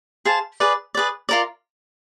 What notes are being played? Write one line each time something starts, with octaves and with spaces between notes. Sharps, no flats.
G#4 C5 F5 A5
G#4 B4 D5
G#4 B4 D5
F4 A#4 D5